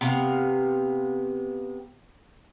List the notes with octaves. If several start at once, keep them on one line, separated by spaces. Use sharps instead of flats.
C3 B3 F5